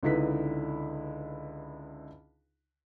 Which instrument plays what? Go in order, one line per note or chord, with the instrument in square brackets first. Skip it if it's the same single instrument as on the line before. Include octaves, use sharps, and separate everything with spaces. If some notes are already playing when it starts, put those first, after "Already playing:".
[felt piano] C#2 D3 D#4 E4 B4 B6